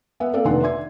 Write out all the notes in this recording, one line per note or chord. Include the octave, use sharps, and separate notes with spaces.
B3 E5 F#5
A#3 C4 A4 B4 D5 F5
F1 D#3 D4 D#4 F#5 C6
D5 E5 C6 G#6